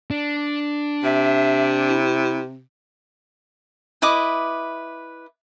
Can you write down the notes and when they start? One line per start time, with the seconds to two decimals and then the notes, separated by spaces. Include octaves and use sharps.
0.11 D4
1.03 C3 E5
1.87 E4
4.02 E4 B4 D#5 D6